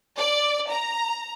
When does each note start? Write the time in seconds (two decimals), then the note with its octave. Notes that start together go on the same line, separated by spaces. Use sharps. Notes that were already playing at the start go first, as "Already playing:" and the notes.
0.18 D5
0.71 A#5